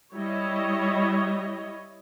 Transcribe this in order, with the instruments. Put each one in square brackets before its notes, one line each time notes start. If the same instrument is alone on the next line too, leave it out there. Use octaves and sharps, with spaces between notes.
[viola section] G3 E4 C#5 D#5